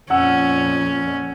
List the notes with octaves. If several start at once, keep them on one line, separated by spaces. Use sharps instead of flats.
F2 A#2 C#4 F#5 E6